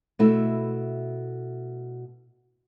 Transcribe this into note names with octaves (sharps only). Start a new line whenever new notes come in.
B2 A3 E4